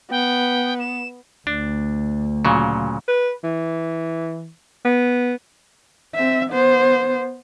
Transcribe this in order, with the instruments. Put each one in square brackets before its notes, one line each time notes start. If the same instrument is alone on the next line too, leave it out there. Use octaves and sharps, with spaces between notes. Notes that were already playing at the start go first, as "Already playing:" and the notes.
[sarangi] B3 [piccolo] G5
[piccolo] E7
[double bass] D2 [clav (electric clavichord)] D4
[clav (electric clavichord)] A#2 C#3 F#3
[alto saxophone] B4
E3
B3
[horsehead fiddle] C4 E5
B3 C5